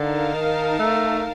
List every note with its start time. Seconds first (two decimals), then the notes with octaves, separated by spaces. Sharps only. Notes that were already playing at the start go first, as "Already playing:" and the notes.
Already playing: D3 D#4 A#4 F5 A5
0.34 D#3
0.79 A3